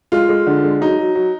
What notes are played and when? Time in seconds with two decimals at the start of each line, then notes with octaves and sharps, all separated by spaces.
0.12 G#3 F4
0.29 G#3
0.47 D3
0.64 G#3
0.81 F#3 D#4
0.98 F#3
1.15 F#3